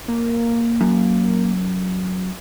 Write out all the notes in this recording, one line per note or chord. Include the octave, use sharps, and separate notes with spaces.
A#3
F#2